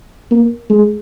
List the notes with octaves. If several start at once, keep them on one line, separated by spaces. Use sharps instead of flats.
A#3
G#3